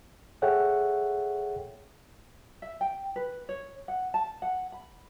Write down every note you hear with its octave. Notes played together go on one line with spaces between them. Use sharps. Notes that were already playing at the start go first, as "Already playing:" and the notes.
G#4 A4 C#5 E5 F#5 G5
E5
G5
B4
C#5
F#5
A5
F#5
B5